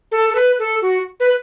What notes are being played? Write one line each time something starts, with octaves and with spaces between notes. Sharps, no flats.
A4
A4
B4
A4
F#4
B4